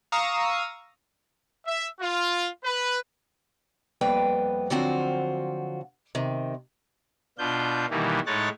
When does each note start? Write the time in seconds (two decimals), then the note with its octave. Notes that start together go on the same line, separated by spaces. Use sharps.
0.12 F5 A#5 C#6 D#6 E6
1.67 E5
2.01 F4
2.65 B4
4.01 F2 G3 A#3 B3 B4 G5
4.70 D3 F3 F#3 C4 F4 F#4
6.15 C3 D#3
7.38 B2 D4 F4 G6
7.90 B2 D#3 E3 G3 A#3
8.26 A2 G#3 D#4 C#5 F#6 A6